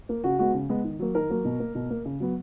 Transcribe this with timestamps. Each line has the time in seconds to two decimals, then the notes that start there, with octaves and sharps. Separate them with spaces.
0.09 A#3
0.24 C#3 F#4
0.39 G#3 B3 F#4
0.54 C#3
0.69 G#3 B3
0.84 D#3
0.99 F#3 A#3
1.15 D#3 A#4
1.29 F#3 A#3
1.45 B2
1.60 A#3
1.75 B2
1.90 A#3
2.05 C#3
2.20 F#3 B3